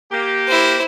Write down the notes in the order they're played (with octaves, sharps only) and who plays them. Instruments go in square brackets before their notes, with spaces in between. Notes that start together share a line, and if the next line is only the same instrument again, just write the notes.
[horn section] A#3 G4
[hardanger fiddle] E4 C5